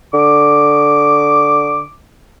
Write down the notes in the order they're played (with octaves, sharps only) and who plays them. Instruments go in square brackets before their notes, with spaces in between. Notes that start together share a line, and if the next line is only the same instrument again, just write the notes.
[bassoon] D3 [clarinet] D6